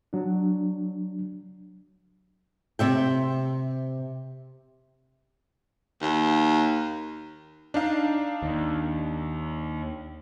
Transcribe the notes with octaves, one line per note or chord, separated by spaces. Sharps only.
F#3 D4
C3 E5 G5
D#2
D4 D#4 F5
D#2